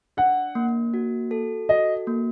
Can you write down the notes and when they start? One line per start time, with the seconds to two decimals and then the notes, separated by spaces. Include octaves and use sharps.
0.17 D4 F#5
0.55 A#3
0.94 F#4
1.31 A4
1.69 F#4 D#5
2.07 A#3